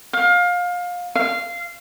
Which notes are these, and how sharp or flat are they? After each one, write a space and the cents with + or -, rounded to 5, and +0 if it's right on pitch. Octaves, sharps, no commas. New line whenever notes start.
F5 +25
F5 -15